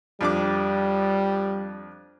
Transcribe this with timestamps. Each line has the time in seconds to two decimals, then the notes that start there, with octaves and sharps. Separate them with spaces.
0.21 F2 G3 D4 D6